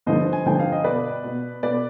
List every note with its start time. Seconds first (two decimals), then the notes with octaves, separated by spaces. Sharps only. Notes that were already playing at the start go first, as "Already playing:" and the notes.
0.06 G2 D3 F3 C5 D#5
0.33 G#5
0.46 G2 D3 F3 G5
0.59 F5
0.72 D#5
0.84 B2 B4 D5
1.24 B2
1.63 B2 B4 D5